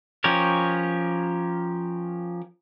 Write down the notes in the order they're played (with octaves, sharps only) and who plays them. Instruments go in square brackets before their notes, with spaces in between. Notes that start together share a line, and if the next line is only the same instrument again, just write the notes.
[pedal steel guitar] F3 C#4 G4 A#4 C#5